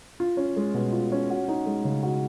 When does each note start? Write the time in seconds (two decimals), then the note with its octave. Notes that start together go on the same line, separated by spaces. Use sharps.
0.20 F4
0.37 C#4
0.56 G#3
0.74 B2
0.92 F4
1.12 C#4
1.30 F#4
1.48 D#4
1.66 G#3
1.85 C#3
2.03 F#4